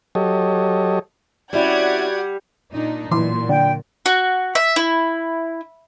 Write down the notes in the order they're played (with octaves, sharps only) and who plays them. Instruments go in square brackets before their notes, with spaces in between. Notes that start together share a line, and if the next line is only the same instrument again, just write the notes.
[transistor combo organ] F#3 G4 A4 C#5 D#5
[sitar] G3 [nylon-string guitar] C4 C#4 E4 [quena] F#4 [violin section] D5 F#5 G#6
[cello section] A#2 D4 D#4
[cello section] A#2 F#3 [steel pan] E3 [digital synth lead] C6
[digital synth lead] D3 [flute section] G5
[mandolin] F#4
E5
E4